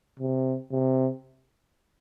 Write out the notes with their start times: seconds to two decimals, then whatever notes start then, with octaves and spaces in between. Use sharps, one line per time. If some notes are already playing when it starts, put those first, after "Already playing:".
0.20 C3
0.72 C3